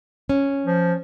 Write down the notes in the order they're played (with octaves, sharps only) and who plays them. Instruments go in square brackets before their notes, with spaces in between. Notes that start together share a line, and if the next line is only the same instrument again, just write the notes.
[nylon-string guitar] C#4
[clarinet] F3